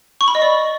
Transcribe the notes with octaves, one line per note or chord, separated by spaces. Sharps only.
C#6
B5
D#5
D5